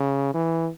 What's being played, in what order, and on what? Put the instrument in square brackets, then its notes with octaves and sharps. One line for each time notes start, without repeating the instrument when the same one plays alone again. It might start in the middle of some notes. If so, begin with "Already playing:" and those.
Already playing: [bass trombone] C#3
E3